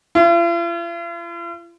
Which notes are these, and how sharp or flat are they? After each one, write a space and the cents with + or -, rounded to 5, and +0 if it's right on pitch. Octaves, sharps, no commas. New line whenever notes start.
F4 -45